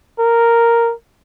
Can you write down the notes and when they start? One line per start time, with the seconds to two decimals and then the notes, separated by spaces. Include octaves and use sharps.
0.19 A#4